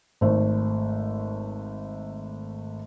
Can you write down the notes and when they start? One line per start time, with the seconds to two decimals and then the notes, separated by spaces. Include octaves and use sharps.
0.21 G#1 A3 C5